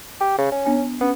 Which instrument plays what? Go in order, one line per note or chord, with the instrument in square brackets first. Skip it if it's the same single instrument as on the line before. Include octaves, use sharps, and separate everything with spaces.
[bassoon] G4
C#3
C#4
[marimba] B3 D4 G#5
[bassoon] B3 [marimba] C#4